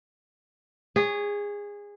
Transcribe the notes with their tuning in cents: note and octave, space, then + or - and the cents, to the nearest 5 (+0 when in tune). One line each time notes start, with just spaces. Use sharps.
G#4 -20 C#5 +15